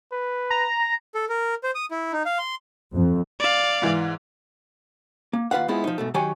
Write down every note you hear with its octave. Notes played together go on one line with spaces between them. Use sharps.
B4
A#5
A4
A#4
C5
D#6
E4
D#4
F5
C6
F2
D5 F5
G#2 E3
A#3
D#2 F4 B4 F5 F#5
G#3 B3 C4 E4 F4 G#4
F3 D#4
G#2 B2 A3
D#3 F#3 G4 C#5 G#5